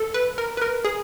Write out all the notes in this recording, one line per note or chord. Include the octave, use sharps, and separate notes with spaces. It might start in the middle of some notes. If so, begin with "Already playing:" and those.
Already playing: A4
B4
A#4
B4
A#4
G#4